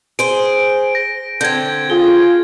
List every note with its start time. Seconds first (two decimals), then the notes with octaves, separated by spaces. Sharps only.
0.19 G#4 C5 D7
0.95 A#6
1.41 D3 C4 G6 G#6
1.90 F4 G#4 G7